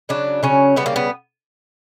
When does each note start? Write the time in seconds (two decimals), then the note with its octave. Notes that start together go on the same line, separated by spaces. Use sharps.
0.09 C#3 F#3 D4
0.43 C#3 F#3 C#4
0.76 C#3 G3 B3
0.86 A#3
0.96 B3